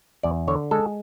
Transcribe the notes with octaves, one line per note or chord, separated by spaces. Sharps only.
E2 D5
D3 C#5
G#3 A4